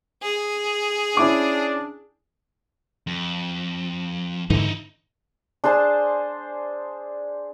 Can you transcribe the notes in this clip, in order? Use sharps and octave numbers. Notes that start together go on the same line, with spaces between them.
G#4
C#4 D4 E4 D6
F2
G#2 D3 E3 D#4 E4
D4 G#4 C5 A5